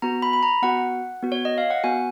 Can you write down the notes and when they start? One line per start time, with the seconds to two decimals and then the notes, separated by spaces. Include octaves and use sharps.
0.02 B3 F#4 A#5
0.22 B5
0.33 B5
0.43 A#5
0.62 B3 F#4 F#5
1.23 B3 F#4
1.32 C#5
1.45 D#5
1.58 F5
1.71 F#5
1.84 B3 F#4 G#5